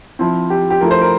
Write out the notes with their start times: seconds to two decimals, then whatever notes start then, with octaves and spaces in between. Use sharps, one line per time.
0.19 F3 C4 E4
0.50 G4
0.70 G4
0.81 F3 A3 E4 A#4
0.91 C5
1.02 A#4